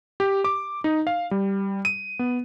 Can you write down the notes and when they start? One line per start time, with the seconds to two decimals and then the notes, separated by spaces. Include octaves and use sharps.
0.20 G4
0.44 D6
0.84 D#4
1.07 F5
1.31 G3
1.85 D#7
2.19 B3